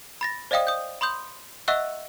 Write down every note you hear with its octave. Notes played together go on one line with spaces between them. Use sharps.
B5 A6 A#6
C5 D5 D#5 F5 G5 D#6
D#6 G6
B5 C6 D#6 G6
D#5 E5 F#5 C#6 E6 F#6